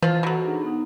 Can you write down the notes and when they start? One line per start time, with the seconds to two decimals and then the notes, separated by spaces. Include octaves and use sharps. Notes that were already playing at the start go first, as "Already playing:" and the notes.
0.02 E3 F3 F4
0.23 B2 F#3 F#4 A4 F#5
0.44 D4 D#4 G#4
0.63 B3 D#4